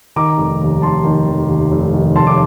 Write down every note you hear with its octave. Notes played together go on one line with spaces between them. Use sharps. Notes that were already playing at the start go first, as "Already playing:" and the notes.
D#3 A#5 D6
F1
D#2
F1 A5 C6
D#3
F1
D#2
F1
D#3
F1 A5 C6
D6